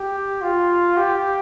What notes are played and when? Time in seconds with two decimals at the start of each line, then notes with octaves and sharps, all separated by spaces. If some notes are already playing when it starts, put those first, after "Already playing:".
Already playing: G4
0.42 F4
0.97 G4